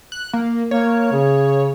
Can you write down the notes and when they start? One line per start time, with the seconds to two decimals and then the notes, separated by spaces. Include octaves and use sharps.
0.12 F#6
0.33 A#3
0.71 A#3 C#5
1.12 C#3